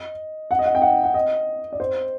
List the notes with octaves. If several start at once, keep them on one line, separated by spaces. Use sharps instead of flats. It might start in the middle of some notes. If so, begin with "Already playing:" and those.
Already playing: D#5
F#5
D#5
F#5
G5
F#5
F#5
D#5
D5
C5